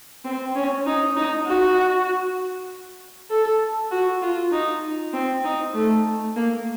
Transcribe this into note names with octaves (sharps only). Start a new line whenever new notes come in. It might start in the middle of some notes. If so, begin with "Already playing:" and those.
C4
C#4
D#4
D#4
F#4
A4
F#4
F4
D#4
C4
D#4
A3
A#3